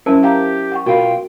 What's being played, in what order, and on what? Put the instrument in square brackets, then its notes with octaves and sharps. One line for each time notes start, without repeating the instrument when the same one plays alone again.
[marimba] F#3 C#4 [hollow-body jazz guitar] E4 [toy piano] A#4 C5 A5
[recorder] G4 [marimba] F5 G5 A#5
[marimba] F#5 G5 C#6
[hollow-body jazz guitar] B2 F4 [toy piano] F#4 [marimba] A#4 F5 B5 [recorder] G5